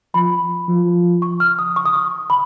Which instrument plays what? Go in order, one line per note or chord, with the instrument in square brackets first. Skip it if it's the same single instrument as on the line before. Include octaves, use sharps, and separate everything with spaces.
[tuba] F3 [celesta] B5
[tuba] F3
[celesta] C#6
F6
D#6
C#6
D#6
C#6
B5